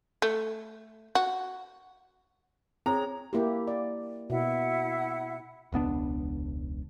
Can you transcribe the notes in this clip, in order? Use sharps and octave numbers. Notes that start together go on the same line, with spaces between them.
A3
F#4
C4 G#4 C#5 A#5
A#3 E4 G4
D5
B2 E4 E5 F#5
E1 C#2 B3 D4